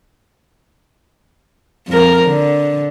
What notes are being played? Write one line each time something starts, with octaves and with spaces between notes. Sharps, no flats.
F2 A#4
D3